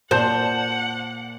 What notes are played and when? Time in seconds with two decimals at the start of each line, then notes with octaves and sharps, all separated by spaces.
0.11 A#2 C5 F#5 A5 G6